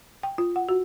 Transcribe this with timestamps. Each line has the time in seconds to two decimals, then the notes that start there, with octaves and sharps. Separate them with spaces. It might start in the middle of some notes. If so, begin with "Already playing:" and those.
0.23 G5
0.38 F4
0.56 F#5
0.69 F#4